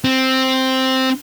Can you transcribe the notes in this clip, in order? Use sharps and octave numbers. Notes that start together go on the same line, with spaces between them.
C4